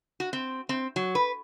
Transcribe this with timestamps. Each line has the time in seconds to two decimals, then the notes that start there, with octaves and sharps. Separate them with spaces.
0.20 F#4
0.33 C4
0.69 C4
0.96 F#3
1.15 B4